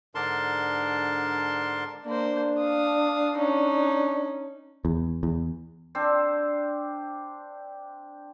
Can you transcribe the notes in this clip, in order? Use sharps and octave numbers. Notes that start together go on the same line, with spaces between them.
G#2 D3 D4 A#4 A5 C6
A#3 D4 C5
F5 D#6
C#4 D#4
E2
E2
C4 D4 C5